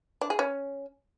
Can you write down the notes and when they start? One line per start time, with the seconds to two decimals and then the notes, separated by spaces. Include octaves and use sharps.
0.21 D4
0.30 G#4
0.39 C#4